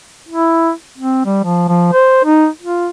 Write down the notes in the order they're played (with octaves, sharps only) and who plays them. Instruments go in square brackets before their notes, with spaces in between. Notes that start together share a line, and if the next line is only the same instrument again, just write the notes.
[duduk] E4
C4
G3
F3
F3
C5
D#4
F4